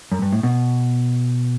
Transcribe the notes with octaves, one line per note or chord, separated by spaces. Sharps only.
F#2
G2
A2
B2